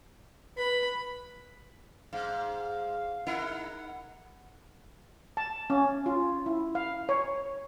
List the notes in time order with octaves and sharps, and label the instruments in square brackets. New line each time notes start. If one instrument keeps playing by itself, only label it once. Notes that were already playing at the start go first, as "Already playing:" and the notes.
[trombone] B4 [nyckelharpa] B5
[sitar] G#2 [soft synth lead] F5
[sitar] D#4 E4 A#4 [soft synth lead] F#5
[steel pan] A5
C#4
F4
E4
F5
C#5